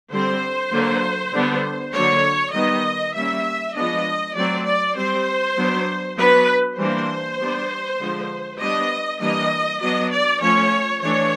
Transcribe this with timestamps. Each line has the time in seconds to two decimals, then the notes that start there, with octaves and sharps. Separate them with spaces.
0.12 D3 G3 C4 C5
0.72 D3 F#3 A#3
1.33 D3 G3 B3 D4
1.93 D3 F#3 A#3 D4 C#5
2.54 D#3 G3 B3 D#5
3.15 G3 A#3 C#4 E5
3.75 F3 G#3 B3 D4 D#5
4.36 F#3 A3 C4 D5
4.66 D5
4.96 G3 C4 C5
5.57 F#3 B3 D4
6.17 F#3 B3 D4 B4
6.78 E3 G3 A#3 D4 C5
7.39 G3 B3 D4
8.00 D3 F3 G#3
8.61 G3 B3 D4 D#5
9.21 E3 G3 A#3 D4 D#5
9.81 F#3 B3 D4 D#5
10.11 D5
10.41 F3 A3 C#4 C#5
11.02 E3 A3 D4 C#5